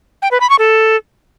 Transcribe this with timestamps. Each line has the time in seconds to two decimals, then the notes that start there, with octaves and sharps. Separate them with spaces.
0.22 G5
0.31 B4
0.41 B5
0.50 C#6
0.59 A4